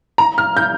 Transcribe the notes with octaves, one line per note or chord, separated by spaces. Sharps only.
A#5
F6
G6